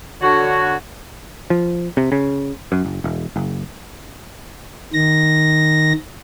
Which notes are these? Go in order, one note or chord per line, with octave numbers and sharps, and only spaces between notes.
D3 F#4 C#5
F3
C3
C#3
F#2
F#1
E1
F#1
D#3 A#6